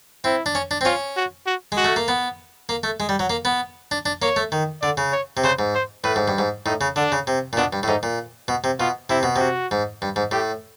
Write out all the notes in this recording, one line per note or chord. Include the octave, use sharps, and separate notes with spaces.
C4 E4
D4
C#4
D4
C4
C#4 F4
F#4
F#4
G#3
F#4
A3
A#3
B3
A#3
A3
G#3
G3
F#3
A#3
B3
D4
D4
A#3 C#5
A3
D#3
D3 D5
C#3
C#5
C3
C#3 C5
G#2
C5
A2 B4
G#2
G2
G#2
A2 D#4
C#3
D3 D4
C#3
C3
A#2
B2 D4
G2
A2
G#2 D#4
A#2
B2
C3
B2 F4
C3 E4
B2
C3 F#4
G#2
G2
G#2
A2 G4